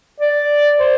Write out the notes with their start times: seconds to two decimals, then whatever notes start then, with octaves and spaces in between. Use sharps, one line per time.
0.20 D5
0.80 C5